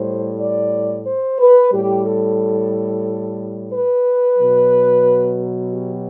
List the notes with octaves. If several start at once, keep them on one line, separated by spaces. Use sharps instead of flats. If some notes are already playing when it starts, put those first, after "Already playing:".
Already playing: A2 G3 C5
D5
C5
B4
A2 G3 G4
A4
B4
B2 F#3
G4